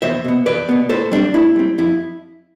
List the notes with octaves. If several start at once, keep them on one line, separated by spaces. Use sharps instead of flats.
E2 C5 E5
B2 B3
E2 B4 D5
B2 B3
A2 A4 C5
G3 C4 D4
A2 E4
G3 C4
F2 E4